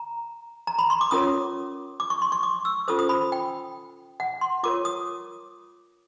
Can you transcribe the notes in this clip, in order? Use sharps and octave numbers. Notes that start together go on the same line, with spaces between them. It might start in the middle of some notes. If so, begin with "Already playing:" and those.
Already playing: A#5
A#5
B5
C6
D6
C#4 F4 A#4 C#5 D#6
D6
C#6
C6
C#6
D6
E6
C#4 F4 A4 C5 D#6
D#6
B5
G5
F#5
C6
F4 A#4 C#5 D6
D#6